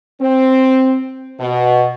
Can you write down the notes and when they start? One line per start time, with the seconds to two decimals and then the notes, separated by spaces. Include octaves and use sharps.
0.20 C4
1.40 B2